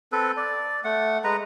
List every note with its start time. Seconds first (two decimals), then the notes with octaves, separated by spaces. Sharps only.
0.12 C4 A4 B4
0.37 D5
0.84 A3 F#5
1.24 G#3 B4 A#5